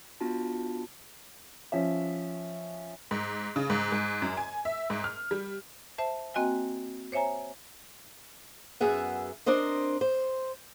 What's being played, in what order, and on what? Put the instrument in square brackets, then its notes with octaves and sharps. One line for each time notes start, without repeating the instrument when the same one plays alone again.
[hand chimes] B3 D4 F4 F#4 A5
[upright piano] F3 C#4 C#5 E5
[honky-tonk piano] G#2
C#3
G#2
G#2
F#2
G#5
E5
G#2
F6
G3
[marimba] C5 E5 A5
A#3 C4 F#4 D#5 G5 G#5
C5 C#5 E5 G#5 A#5
[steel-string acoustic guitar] F#2 B3 G#4 E5 F#5
C4 D4 A#4 C5 D#5
C5